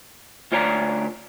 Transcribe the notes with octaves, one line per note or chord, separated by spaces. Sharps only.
D2 F4 C#5 D5 A#5